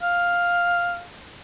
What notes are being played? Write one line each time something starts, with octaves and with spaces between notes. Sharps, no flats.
F5